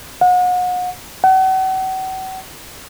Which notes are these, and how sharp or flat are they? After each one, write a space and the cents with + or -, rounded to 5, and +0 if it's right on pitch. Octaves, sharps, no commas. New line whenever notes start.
F#5 -35
F#5 +40